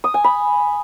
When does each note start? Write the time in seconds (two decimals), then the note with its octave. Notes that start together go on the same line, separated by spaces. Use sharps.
0.04 D#6
0.14 G#5
0.24 B5